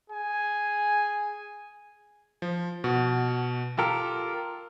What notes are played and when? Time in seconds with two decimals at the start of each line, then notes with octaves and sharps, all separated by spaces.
0.10 G#4 G#5
2.42 F3
2.84 B2 F#4
3.79 F4 G4 A4 A#4